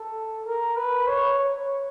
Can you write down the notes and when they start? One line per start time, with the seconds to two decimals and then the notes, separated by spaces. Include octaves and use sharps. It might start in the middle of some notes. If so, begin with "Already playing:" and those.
Already playing: A4
0.46 A#4
0.76 B4
1.07 C#5
1.39 C#5